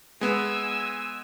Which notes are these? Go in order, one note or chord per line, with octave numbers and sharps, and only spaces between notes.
G#3 B3 G#5 E6